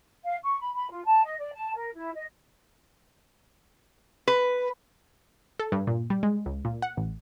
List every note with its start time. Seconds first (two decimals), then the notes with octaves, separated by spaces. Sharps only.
0.25 F5
0.44 C#6
0.60 B5
0.73 B5
0.90 F4
1.06 A5
1.24 D#5
1.39 D5
1.55 A5
1.76 A#4
1.94 E4
2.14 D#5
4.28 B4
5.60 A4
5.72 G2
5.87 A#2
6.10 G3
6.23 G#3
6.46 C#2
6.65 A#2
6.82 F#5
6.97 A1